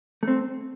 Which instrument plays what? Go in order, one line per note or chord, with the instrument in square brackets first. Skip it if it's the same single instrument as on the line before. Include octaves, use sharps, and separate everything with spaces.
[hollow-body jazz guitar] A3 C4